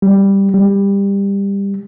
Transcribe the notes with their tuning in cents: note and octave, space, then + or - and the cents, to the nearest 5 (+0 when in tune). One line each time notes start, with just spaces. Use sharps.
G3 +5
G3 +20